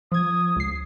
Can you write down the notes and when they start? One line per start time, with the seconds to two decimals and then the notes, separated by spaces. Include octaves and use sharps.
0.12 F3 D#6 G#6
0.56 C#2 C7